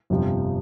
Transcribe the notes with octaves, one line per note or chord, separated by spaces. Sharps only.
G1 F2 C3 F3